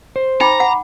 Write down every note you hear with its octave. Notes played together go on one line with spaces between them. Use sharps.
C5
D#4 G5 A#5 B5 D6
F#5